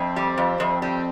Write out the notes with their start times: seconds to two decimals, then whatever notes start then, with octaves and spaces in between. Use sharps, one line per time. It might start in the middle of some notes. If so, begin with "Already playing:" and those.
Already playing: F2 C4
0.16 G3
0.38 F2
0.60 F2
0.82 G3 C4